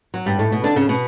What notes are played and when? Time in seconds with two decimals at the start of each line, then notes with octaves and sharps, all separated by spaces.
0.14 F#3
0.26 G2 G3
0.39 A2 A3
0.52 B2 B3
0.64 D3 D4
0.76 C#3 C#4
0.89 B2 B3